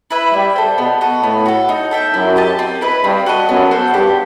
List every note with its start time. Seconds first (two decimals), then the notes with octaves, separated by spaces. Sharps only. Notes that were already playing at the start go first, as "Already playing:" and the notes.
0.11 E4 B4 E5
0.33 G3 E4
0.56 A4 C5
0.78 B2 B3
1.01 F#4 A4 D#5
1.23 A2 B3
1.46 F#4 A4
1.69 D#4
1.91 A4 E5 G5
2.14 F#2 E4
2.36 G4 D#5 A5
2.59 C4
2.81 E4 B4 D#5
3.04 G2 C4
3.26 F#4 A4 D#5
3.48 F#2 B3
3.71 F#4 A4 C5
3.94 G2 G4